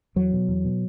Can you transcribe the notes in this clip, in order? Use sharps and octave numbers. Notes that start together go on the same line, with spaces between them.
E2 F#3
B2
E2
B2